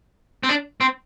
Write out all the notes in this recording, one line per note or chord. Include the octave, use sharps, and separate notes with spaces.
C4
D4
C4